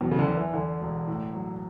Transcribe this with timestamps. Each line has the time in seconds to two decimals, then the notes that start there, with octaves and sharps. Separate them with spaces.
0.01 E2 B2
0.11 C#3
0.19 D3
0.27 E2
0.37 E3
0.53 E2 D3
0.81 E1
1.07 A2
1.34 F#3